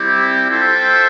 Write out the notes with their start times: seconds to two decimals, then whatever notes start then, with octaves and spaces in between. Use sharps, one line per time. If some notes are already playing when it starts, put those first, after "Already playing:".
Already playing: G3 C4 E4 G4
0.48 F4 A4 C5 E5 G5